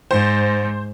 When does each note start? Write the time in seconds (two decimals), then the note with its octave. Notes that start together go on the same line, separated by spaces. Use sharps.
0.11 G#2 C5